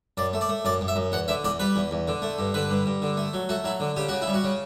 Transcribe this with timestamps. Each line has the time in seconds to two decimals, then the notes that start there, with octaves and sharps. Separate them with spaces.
0.17 F#2 D5
0.33 A3
0.41 D5
0.49 A3
0.65 F#2 D5
0.81 F#2
0.88 E5
0.96 F#2
1.12 E2 F#5
1.28 D3 E5
1.44 E2 D5
1.60 G3 B4
1.76 E2
1.91 E2
2.08 D3
2.22 A3
2.39 G2
2.54 D3 B4
2.70 G2
2.86 G2
3.02 D3
3.17 A3
3.33 F#3
3.49 A3 F#4
3.64 F#3 E4
3.80 D3
3.96 C#3 G4
4.08 C#3 F#4
4.22 E4
4.27 G3
4.34 F#4
4.44 C#3